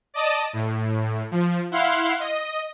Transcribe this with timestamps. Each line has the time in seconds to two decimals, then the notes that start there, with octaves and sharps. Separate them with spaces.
0.14 D5 D#5 A5 D#6
0.53 A2
1.31 F3
1.71 E4 F5 F#5 C6
2.20 D#5